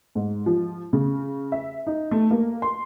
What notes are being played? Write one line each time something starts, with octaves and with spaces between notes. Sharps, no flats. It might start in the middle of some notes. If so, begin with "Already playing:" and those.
G#2
F3
C#3
E5
D#4
A3
A#3
C6